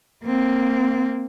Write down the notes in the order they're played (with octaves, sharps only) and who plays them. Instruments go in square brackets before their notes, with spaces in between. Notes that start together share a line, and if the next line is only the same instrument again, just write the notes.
[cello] A#3 C4